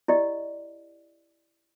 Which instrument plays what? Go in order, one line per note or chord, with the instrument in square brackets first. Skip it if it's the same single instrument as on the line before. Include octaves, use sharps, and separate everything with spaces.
[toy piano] E4 G4 D5 D#5